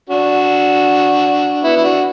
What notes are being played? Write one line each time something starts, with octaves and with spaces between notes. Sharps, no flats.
D4 F#4
B3 E4
E4
D4 F#4